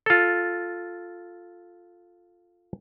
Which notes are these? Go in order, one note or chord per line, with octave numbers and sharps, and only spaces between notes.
F4 A4